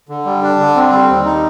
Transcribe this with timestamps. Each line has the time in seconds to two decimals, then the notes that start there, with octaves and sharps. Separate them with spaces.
0.09 D3
0.25 G3
0.43 D4
0.59 D3
0.75 C4
0.92 G3
1.09 D#2
1.25 D#4